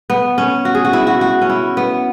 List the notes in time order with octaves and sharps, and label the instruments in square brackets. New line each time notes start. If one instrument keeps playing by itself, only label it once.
[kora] B3
C#4
F#4
G#4
F#4
E4
F#4
F#4
C#4
E4
B3